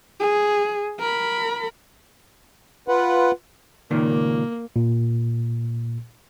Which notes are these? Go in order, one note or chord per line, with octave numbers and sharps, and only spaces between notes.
G#4
A#4 B5
F4 B4 F#5
C#2 A#2 D#3 A#3
A#2